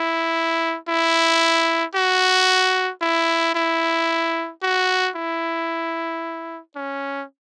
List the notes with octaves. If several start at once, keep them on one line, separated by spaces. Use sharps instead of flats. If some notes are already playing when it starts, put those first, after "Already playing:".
Already playing: E4
E4
F#4
E4
E4
F#4
E4
C#4